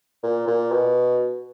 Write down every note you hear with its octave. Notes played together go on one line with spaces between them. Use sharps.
A#2
A#2
B2